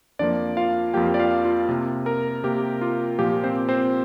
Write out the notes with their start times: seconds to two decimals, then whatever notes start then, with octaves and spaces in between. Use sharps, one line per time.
0.19 F2 F3 A#3 D4 D5
0.57 F4 F5
0.94 F2 F3 A#3 G4 G5
1.14 D5
1.19 F4 F5
1.45 F4 F5
1.69 C3 A#3
2.06 A#4 A#5
2.44 C3 A#3 G4
2.81 F4
3.18 A#2 F3 A#3 G4
3.44 C4 C5
3.69 C4 C5